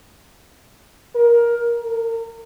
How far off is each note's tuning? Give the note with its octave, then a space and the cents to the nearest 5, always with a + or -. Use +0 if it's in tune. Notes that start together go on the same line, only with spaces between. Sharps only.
A#4 +15
A#4 -35